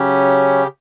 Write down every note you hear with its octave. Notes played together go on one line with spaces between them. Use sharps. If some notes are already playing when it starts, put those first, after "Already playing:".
Already playing: C#3 F#3 C#4 G4